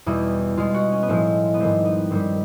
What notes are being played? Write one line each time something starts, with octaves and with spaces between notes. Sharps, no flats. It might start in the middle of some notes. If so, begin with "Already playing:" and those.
E2 B2 G3 E4
B2 G#3 F4
F#4
C#4
B3
A2 F3 G#3 C4
B3
G#2 D#3 G3 C4
B3
G2 D#3 G3 C4